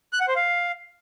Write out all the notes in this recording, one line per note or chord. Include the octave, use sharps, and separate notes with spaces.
F#6
F#5
C5
F5